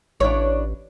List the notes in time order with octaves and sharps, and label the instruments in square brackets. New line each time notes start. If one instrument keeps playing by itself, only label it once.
[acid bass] A1 [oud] D4 E4 C#5